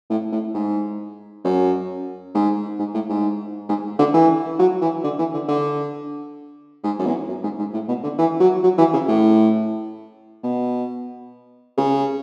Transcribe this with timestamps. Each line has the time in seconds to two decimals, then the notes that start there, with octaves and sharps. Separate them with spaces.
0.10 A2
0.32 A2
0.55 G#2
1.44 F#2
2.35 G#2
2.79 G#2
2.94 A2
3.09 G#2
3.69 G#2
3.99 D3
4.14 E3
4.59 F#3
4.82 E3
5.04 D3
5.19 E3
5.34 D3
5.49 D3
6.84 G#2
6.99 F#2
7.06 E2
7.29 F#2
7.43 G#2
7.59 G#2
7.73 A2
7.88 B2
8.04 D3
8.18 E3
8.41 F#3
8.63 F#3
8.78 E3
8.93 C#3
9.08 A2
10.44 B2
11.78 C#3